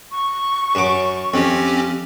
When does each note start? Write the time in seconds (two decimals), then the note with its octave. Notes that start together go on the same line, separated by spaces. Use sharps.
0.12 C#6
0.75 F#2 D6
1.34 F2 C4 C#4 G4